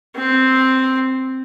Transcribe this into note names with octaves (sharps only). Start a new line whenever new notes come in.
C4